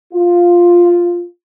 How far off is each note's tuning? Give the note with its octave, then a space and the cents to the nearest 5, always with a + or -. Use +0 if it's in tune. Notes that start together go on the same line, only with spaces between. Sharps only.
F4 +0